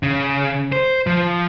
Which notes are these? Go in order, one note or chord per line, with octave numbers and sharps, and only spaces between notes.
C#3
C5
F3